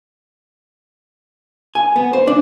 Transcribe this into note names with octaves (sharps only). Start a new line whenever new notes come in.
G#5
B3
C5
D4